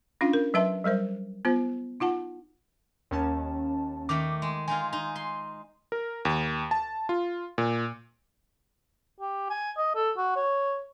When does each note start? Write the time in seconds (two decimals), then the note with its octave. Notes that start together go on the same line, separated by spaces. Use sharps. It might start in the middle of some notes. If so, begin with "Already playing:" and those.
0.21 C#4 D4 F4 F5
0.33 A#4
0.54 F#3 B4 E5 A5 C6
0.84 F#3 G3 A#4 C5
1.45 B3 F4 C5
2.00 D#4 F4 F#5 A5
3.11 D#2 C#4 A5
4.09 D#3 A3 D6
4.42 G#3
4.68 G#3 D#4 F4 G#5
4.93 D#4
5.16 C6
5.92 A#4
6.25 D#2
6.71 A5
7.09 F4
7.58 A#2
9.21 G4
9.50 G#5
9.77 D#5
9.95 A4
10.18 F#4
10.36 C#5